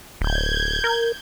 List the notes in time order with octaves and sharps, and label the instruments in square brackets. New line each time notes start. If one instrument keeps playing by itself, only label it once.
[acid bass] D1 [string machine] G6 G#6
[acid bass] A#4